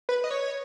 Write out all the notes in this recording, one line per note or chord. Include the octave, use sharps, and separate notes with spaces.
B4
D#5
C#5